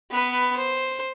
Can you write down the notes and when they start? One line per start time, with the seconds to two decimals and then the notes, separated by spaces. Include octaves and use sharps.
0.11 B3 B4
0.57 C5